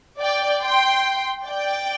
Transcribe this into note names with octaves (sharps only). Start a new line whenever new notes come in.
D5 G5
G5 C6
D5 G5